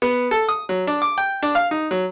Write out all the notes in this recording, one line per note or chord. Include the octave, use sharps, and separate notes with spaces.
B3
A4
D#6
F#3
D4
D6
G5
D4
F5
D#4
F#3